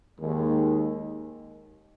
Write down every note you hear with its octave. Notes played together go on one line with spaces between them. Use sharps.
D#2 D#3 G#3